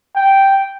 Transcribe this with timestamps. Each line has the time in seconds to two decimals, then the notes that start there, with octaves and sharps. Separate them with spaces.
0.15 G5